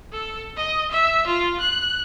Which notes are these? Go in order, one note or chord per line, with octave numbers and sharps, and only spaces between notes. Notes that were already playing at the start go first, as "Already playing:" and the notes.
A4
D#5
E5
F4
F#6